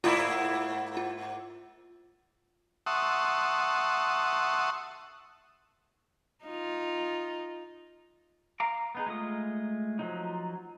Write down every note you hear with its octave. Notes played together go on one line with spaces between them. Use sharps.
G#2 A#3 E4 F4 D#6
F4
E5 F#5 A5 C6 C#6 D#6
D#4 F4
F5 A#5 D6
B3 D#4 G#4
G#3 A3 F4 D#6
F3 F#3 D#4